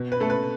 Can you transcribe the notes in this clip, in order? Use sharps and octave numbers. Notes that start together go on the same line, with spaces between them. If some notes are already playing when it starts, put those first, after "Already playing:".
Already playing: B2
B4
A3 A4
B4